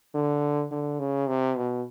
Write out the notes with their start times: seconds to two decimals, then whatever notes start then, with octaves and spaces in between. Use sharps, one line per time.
0.15 D3
0.71 D3
1.00 C#3
1.28 C3
1.57 B2